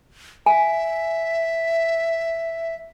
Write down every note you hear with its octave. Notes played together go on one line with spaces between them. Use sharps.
E5 G#5